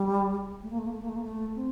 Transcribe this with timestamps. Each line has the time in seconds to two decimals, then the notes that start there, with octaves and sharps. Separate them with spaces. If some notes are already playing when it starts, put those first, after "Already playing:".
Already playing: G3
0.62 A3
0.70 A#3
0.78 A3
0.85 A#3
0.92 A3
1.01 A#3
1.08 A3
1.15 A#3
1.23 A3
1.55 C4